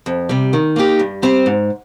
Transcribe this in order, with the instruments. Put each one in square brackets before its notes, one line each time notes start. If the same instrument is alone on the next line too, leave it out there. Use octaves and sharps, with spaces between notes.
[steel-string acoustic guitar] F2
C3 G3
D#3
A#3 D#4 G4
G2
G3 C4 G4 C5
G#2